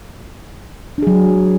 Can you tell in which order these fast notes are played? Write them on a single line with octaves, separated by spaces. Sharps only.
D4 G#4 F#3